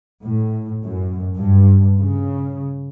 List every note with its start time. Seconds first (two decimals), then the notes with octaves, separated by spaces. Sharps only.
0.24 A2
0.83 F#2
1.36 G2
1.97 C#3